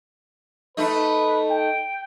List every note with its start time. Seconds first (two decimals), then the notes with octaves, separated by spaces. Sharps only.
0.77 A3 D#4 B4
1.50 G5